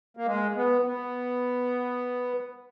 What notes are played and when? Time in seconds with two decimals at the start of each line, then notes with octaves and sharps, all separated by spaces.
0.17 A#3
0.26 G#3
0.56 B3
0.86 B3